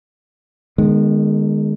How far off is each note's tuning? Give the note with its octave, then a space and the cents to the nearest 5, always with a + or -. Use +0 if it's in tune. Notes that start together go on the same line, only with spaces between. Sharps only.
D#3 -35 G#3 +0 B3 -15